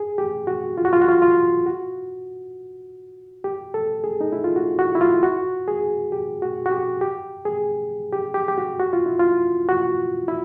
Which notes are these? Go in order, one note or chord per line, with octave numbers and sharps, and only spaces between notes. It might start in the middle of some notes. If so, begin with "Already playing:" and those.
Already playing: G#4
G4
F#4
F4
F#4
F4
F#4
F4
F4
F#4
G4
A4
G#4
D#4
E4
F4
F#4
F#4
E4
F4
F#4
G#4
G4
F#4
F#4
G4
G4
G#4
G4
G4
G4
F#4
F#4
F4
E4
F4
F#4
E4